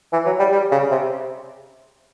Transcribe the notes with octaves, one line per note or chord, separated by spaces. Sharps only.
E3
F#3
G3
G3
C#3
C3